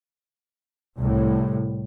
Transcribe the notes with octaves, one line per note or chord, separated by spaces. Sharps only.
C2 A2